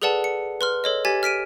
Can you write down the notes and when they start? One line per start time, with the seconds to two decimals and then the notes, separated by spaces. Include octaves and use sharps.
0.02 G#4 A4 B4 D5 F#5 A5
0.24 C#7
0.61 B4 C6 F6
0.84 A4 C#5 D#5
1.05 G4 G#5 G#6 A6 B6
1.23 F6 B6 D7 D#7